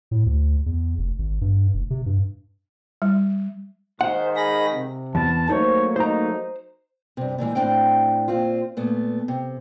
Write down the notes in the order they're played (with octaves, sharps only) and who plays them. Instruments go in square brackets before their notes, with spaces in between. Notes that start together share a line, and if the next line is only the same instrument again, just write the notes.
[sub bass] A2
D2
E2
F1
G#1
G2
F1
C3
G2
[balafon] G3
[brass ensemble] G#2 D#3 [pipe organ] C5 [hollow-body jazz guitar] F#5
[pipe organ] G#4 B5 A#6
C3
[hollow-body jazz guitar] E2 [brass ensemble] A5
[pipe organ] F#3 A3 A#3 [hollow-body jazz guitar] D#4 [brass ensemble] C5 C#5
[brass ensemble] D#4 [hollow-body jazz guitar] C5 A#5
[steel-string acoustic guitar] G2 C3
A#2 D3 E3 G#3
A2 C4 D4 G5
A#2 C4 F4
A#2 A3 B3
C3